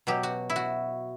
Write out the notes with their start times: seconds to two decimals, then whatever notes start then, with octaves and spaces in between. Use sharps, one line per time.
0.07 B2 F#3 G4
0.23 F#4
0.50 E4
0.56 F#4